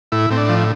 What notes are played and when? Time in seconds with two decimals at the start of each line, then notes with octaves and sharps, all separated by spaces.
0.12 A2 E4
0.30 A2 C4
0.37 D4
0.49 F3